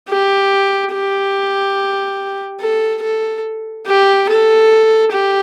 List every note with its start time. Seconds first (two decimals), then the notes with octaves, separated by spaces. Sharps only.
0.09 G4
0.92 G4
2.60 A4
3.03 A4
3.86 G4
4.29 A4
5.12 G4